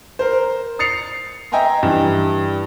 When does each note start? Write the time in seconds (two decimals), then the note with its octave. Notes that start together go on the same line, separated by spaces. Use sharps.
0.19 A#4 C5
0.79 D#6 A6 C7 C#7 F7
1.52 D#5 E5 G5 G#5 A#5 C6
1.83 G2 E3